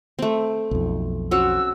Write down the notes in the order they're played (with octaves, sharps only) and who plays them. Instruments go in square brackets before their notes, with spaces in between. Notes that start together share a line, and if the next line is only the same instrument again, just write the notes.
[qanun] A3 C4
[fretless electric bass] B1 F2
[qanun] C4 C#4 F#4 [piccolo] E6